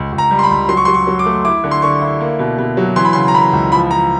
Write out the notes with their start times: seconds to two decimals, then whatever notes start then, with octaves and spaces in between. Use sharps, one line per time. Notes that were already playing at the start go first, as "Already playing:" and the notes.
Already playing: C#2
0.12 C#2
0.18 A#5
0.31 G3
0.39 C6
0.43 B5
0.50 C#2
0.69 F#3 C6
0.77 C#6
0.85 F#3 C6
0.94 C#6
1.07 F#3
1.19 D6
1.25 A3
1.45 E4 D6
1.64 D3
1.71 C6
1.82 D3 C#6
2.01 E4
2.20 A#3
2.39 B2
2.58 B2
2.77 F#3
2.96 E3 C6
3.05 B5
3.13 C#3 C6
3.28 A#5
3.34 E3 B5
3.53 C#2
3.72 F3 B5
3.91 F3 A#5